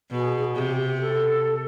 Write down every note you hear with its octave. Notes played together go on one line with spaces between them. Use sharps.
B2 G#4
C3 G4
G4
G4
A4